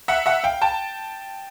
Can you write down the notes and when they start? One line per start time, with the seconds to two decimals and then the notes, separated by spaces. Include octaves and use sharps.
0.08 E5 F#5
0.26 E5 F#5
0.44 F5 G5
0.61 G5 A5